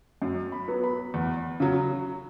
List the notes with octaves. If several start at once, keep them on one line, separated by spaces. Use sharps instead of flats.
F#2
B5
F#3 B3
B5
E2
C#3 F#3